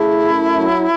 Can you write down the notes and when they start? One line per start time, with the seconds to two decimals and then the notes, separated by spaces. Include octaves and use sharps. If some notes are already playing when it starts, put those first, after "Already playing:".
Already playing: C#3 A3 E4
0.20 F#2
0.56 F#3